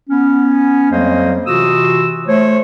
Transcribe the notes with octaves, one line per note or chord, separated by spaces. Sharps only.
B3 C#4
F2 F#3 G3 A#3 C5 D#5
C3 E3 F4 F#4 D#6 E6
A3 C5 C#5